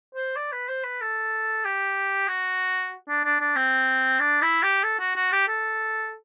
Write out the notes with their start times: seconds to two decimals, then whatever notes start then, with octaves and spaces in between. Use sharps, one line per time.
0.15 C5
0.36 D5
0.52 B4
0.69 C5
0.84 B4
1.01 A4
1.65 G4
2.28 F#4
3.09 D4
3.24 D4
3.40 D4
3.56 C4
4.20 D4
4.42 E4
4.63 G4
4.83 A4
5.00 F#4
5.15 F#4
5.32 G4
5.48 A4